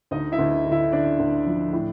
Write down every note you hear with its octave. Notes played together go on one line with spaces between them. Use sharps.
D2 D#4 D#5
E4 E5
D2
D3
E4 E5
D3 D4 D5
D2
F3
A2